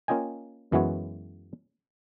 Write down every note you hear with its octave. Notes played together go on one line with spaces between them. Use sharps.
A#3 C#4 F4 D#5 G5 G#5
F#2 E3 G#3 B3 F#4 C#5